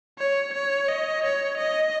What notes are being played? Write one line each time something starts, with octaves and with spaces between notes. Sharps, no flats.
C#5
C#5
D#5
C#5
D#5